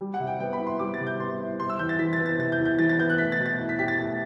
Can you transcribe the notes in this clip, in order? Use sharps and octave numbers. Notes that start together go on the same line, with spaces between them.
G3
F#5
C3
G5
B3 G5
B5
E4
C6
G3 D6
A6
C3
G6
B3 C6
E4
C3 C6
E6
E2 G6
A6
E3 B6
A6
B3
A6
C3 A6
G6
E2
G6
E3 A6
A6
B3 G6
F#6
A3 B6
A6
B2
A6
E4
B6
G4 B6
A6
A3